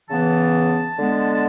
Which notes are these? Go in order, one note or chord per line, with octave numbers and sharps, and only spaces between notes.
C#3 E3 B3 A5
D3 G#3 B3
A5